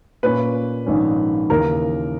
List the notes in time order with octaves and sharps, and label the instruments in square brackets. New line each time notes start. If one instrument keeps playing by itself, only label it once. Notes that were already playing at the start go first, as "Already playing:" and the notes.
[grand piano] A#2 A#3 C#4 [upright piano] B4
[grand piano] A#1 G#2 D#3 A#3 C#4
[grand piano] D#2 C#3 E3 [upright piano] A#4